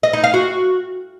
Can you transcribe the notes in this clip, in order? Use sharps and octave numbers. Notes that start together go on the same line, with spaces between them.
D#5
D#4
F5
F#4